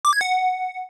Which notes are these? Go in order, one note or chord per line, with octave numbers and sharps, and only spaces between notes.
D6
G#6
F#5